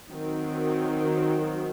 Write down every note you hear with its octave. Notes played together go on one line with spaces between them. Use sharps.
D#3 F#3 C4